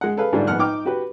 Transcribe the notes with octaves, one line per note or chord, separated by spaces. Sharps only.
G#3 F#5
G#4 A4 B4 F5
G#2 D3 G3 A3 D4 F4
A#1 G#2 B3 F#5 F6 F#6
D#4 G5 D6 F6
F#4 G4 B4